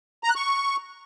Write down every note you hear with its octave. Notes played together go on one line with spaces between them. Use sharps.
A#5
F#6
C#6